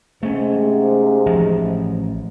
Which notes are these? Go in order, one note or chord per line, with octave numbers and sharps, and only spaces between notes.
G#2 C3 A3 C#4
A1 F3